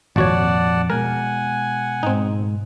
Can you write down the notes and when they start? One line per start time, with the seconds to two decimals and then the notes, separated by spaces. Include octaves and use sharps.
0.16 G#1 F2 A#2 F#4 C#5 D5 F#5 A5
0.90 B2 G#3 A#4 F#5 G#5
2.03 G#2 C4 D#4